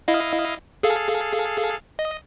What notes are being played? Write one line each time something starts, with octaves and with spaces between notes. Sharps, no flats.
E4 D#5 F5
G#4 A4 F5
D#5